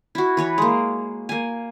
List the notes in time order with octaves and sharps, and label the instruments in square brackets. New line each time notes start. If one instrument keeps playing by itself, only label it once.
[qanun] E4 F#4
E3 B4 C#5
G#3 A#3
A#3 G#5